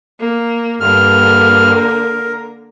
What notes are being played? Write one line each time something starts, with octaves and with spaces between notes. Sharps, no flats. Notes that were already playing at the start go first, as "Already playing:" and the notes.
A#3
G2 D3 A#3 F6
A#4